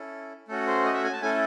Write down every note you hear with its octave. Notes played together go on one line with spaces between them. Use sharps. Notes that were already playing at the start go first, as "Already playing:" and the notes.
Already playing: C#4 E4 A4
A3 C#4 F#4 A4
C5
D#5
E5
G#5
A5
A3 C#4 E4 A4 G#5